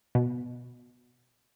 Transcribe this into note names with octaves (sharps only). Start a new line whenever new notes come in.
B2